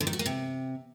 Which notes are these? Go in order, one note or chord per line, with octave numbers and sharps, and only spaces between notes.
D3
D#3
F#4
A#3
C3